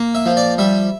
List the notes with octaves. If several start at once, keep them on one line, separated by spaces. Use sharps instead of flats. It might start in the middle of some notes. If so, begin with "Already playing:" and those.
Already playing: A#3
E5
F3
D5
G3 E5